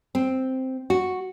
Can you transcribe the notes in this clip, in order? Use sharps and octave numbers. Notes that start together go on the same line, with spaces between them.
C4
F#4